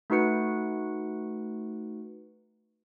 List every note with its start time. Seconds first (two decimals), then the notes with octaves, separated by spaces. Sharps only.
0.10 A3 D#4 F#4 B4 C#7